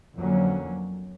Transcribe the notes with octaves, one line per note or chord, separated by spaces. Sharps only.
F2 D3 F#3 A#3 C#4